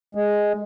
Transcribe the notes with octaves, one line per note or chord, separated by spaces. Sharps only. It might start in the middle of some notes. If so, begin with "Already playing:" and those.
G#3